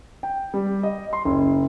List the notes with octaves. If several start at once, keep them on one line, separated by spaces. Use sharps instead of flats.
G5
G3
D#5
C6
F#1